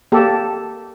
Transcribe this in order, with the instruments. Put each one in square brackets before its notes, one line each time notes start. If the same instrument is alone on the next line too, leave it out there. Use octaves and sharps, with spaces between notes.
[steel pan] A#3 G4 A4